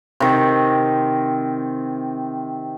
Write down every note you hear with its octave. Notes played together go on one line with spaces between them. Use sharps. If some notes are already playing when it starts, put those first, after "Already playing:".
C3 D#3